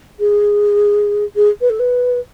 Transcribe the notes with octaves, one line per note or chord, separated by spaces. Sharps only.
G#4
G#4
B4
A4
B4